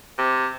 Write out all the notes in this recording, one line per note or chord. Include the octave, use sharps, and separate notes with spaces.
C3